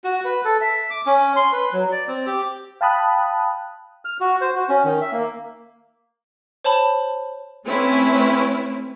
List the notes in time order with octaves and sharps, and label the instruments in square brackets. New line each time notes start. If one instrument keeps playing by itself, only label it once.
[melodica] F#4
B4
A4
E5
D6
C#4
C6
B4
F#3
D5
C4
G4
[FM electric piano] F5 G5 A5 B5 D#6 F#6
[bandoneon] F6
F#4
C5
F#4
C#4
D#3
E5
A#3
[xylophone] C5 C#5 A5 B5
[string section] A3 C4 C#4 E4 B4